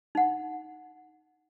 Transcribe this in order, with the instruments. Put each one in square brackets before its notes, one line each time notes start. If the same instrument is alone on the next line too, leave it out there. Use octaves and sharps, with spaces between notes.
[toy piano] D#4 F#5